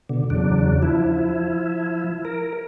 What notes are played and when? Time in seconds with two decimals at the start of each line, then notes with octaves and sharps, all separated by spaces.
0.09 B2 D3
0.30 E2 C#3 F#3 D4
0.83 F3 E4
2.25 A#4